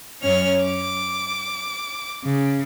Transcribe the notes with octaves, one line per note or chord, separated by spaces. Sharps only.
F#2 C#4 C#5 F6
D6
C#3